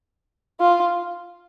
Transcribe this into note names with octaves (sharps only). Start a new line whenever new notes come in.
F4